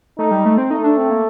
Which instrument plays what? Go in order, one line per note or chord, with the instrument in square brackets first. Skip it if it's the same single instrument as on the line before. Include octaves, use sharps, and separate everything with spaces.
[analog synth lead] A3 [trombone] D#4
[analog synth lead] G3
A3
C4
[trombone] A3 [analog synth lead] D#4
[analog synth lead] D4
C4
A#3